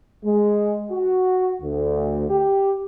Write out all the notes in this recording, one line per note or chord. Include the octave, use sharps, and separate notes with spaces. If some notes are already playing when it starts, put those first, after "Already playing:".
G#3
F#4
D2
G4